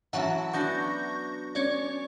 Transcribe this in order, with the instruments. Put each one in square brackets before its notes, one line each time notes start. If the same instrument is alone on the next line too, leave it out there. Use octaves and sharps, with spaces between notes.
[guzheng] E3 F#3 C#4 [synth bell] E5 F#5 A5
[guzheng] B3 D4 F#4 [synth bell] C#6 G6 A#6
[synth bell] C#4 C#5 D5